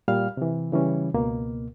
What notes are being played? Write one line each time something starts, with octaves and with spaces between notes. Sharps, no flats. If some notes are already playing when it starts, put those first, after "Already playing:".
A#2 G3 F5 F6
C3 E3
C#3 E3 G3 C#4
C#2 B2 A#3